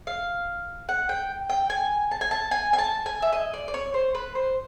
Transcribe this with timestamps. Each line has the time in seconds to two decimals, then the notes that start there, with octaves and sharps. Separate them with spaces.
0.07 F5
0.89 F#5
1.09 G5
1.50 G5
1.70 G#5
2.11 A5
2.21 G#5
2.31 A5
2.51 G#5
2.73 G#5
2.78 A5
3.06 G#5
3.22 E5
3.33 D#5
3.54 D5
3.68 D5
3.74 C#5
3.94 C5
4.15 B4
4.35 C5